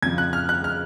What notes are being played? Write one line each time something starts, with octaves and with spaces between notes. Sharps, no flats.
F2 C#3 F3 G#6
F#6
F6
F#6
F6